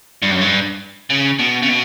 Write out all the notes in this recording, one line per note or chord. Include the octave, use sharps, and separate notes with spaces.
G2
F#2
G2
C#3
B2
C#3
B2